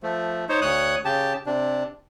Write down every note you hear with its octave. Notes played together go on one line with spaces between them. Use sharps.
F3 A3
D#4 C5 C#5
D2 C#5 D#6 F#6
C#3 G4 A5
C3 D4